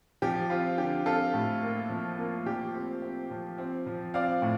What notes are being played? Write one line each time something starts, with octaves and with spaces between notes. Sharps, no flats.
F3 G4
C4 F4
D3 G4
C4 F4 A4
A2
A#3
F3
A#3
F3 G4
C4
C4
F3
C4
F3
C4 D5 F5
A2